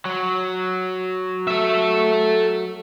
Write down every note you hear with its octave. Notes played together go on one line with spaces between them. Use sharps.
F#3
A4 E5